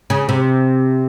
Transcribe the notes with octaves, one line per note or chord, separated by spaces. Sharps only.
C#3
C3